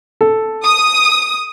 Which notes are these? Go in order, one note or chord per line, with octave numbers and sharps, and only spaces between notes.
A4
D#6